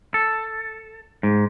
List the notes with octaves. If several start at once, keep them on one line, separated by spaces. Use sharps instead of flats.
A4
G#2